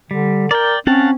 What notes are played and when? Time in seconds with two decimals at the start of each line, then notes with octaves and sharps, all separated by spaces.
0.11 D3 G3
0.51 A#4 D5 G5
0.87 C4 C#4 F5 F#5 A5